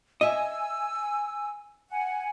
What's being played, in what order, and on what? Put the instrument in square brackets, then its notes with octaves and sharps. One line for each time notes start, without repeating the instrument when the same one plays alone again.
[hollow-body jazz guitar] D#5 E5 [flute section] G#5 E6
[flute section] F#5 G#5